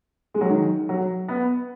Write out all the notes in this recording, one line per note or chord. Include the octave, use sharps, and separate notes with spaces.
G#3
F#3
D#3
F#3
B3